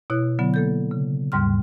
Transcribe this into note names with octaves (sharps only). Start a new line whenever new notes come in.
B2 E4 C#5 F#6
D3 F#3 B3
A#3 A4 G6
C#3
D#2 G#2 G3 C6 F6